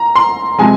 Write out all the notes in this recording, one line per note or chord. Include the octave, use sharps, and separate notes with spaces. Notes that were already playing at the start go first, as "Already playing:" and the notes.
Already playing: A#5
C6
C3 F3 G#3 G#5